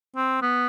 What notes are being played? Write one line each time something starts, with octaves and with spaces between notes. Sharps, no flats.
C4
B3